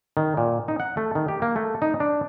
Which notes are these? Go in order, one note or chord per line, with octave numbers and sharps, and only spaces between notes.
D#3
A#2
D#4
F#5
A3
D#3
G4
A#3
A3
D#4
D4